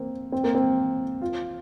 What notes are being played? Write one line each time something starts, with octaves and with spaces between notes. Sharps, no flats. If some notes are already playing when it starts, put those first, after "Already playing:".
Already playing: A#3 C4
C4
A#3
C4
F4